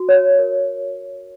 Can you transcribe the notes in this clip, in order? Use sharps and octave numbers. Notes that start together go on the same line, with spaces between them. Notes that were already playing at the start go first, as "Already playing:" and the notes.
Already playing: F#4
C#5
A#4